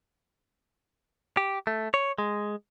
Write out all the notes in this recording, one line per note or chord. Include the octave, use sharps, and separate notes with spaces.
G4
A3
C#5
G#3